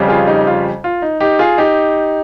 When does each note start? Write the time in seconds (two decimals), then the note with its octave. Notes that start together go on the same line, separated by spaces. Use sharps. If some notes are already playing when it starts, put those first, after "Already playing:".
Already playing: F2 C#3 G3 C#4
0.08 F4 G#4
0.27 D#4 G4
0.47 F4
0.84 F4
1.02 D#4
1.20 D#4 G4
1.39 F4 G#4
1.58 D#4 G4